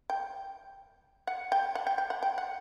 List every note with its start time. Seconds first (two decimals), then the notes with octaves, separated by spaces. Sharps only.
0.10 G5
1.27 F#5
1.52 G5
1.75 F#5
1.87 G5
1.98 G5
2.10 F#5
2.23 G5
2.38 F#5